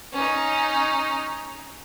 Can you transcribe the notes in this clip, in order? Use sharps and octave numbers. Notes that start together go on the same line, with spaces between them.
C#4 D#4